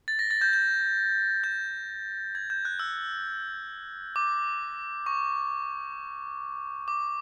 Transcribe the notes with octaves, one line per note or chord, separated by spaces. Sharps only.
A6
A#6
A6
G6
G6
G6
G#6
G6
F#6
E6
D6
C#6
D6